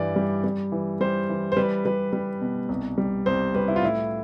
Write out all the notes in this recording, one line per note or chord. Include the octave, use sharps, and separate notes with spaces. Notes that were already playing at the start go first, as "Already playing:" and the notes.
Already playing: G2 E3 G3 D5
G3
G3
E3
G3 C5
E3
C5
G3 B4
G3 B4
G3
B2
C2
G3
C2 C5
G3 B4
E4
F4
A2 E4